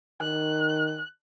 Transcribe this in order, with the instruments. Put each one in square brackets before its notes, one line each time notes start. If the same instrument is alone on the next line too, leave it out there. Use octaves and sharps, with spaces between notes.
[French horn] D#3 [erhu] F#6